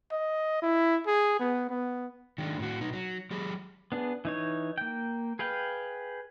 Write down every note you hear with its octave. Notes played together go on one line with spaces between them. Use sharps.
D#5
E4
G#4
B3
B3
D#3 G#3 D4
A2 F#4
B2 D#4
F#3
F#3 G4 G#4
B3 D4 G#4
E3 D#4 C#5
A#3 G5
G#4 B4 F5 G5